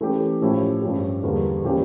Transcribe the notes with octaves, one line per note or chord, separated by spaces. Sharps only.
E3 A3 C#4 G4
A2 F3 C#4 E4 G4
G2 F3 C#4 G4
E2 D3 G3 A#3
A#2 F3 C#4 E4 G4